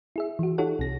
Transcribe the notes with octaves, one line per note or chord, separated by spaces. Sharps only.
E4 G#4 E5
E3 F#4
D#4 F4 G4 A4 C#5 F#5
C2 C3 A#6